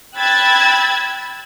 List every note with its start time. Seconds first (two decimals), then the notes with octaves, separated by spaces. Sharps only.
0.18 G5 B5 E6 F#6 G#6 A6